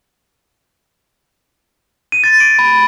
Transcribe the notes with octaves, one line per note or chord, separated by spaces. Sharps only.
D#7
A6
D7
B5